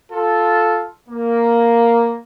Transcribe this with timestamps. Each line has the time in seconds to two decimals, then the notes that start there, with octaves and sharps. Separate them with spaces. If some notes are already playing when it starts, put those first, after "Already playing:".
0.11 F4 A4
1.09 A#3